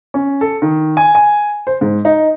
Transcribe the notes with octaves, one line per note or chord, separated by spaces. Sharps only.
C#4
A4
D#3
G#5
G#5
C5
G#2
D#4